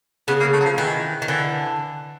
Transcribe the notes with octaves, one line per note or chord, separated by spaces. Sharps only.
C#3 B3
A#3
A3
F#3
F3
D#3 E3
D#3
D3 E3